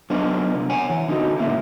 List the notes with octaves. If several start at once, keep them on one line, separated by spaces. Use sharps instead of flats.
F#3 B3 D4 D#4 F4 B4
C2
C#5 F#5 G#5
E3
D3 D#4 F#4
A2 C#3 A#3 C#4 E4